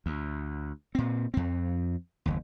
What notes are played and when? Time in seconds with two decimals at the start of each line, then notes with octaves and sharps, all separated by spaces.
0.06 D2
0.95 A#2 C4
1.34 F2 C4
2.26 F#1 D#2